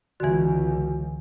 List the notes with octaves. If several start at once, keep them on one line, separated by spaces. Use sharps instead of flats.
C#2 D3 E3 F#4 G#5